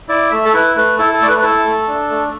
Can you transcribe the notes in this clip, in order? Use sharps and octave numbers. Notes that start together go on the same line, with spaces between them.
E4 D5
A3 E5
A4
E4 B4
A3 B4
E4 A4
A4
A3 D5
B4
B4
E4 A4
A3
D4
A3